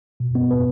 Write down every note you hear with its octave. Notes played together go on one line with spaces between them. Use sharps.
B2
B3
B4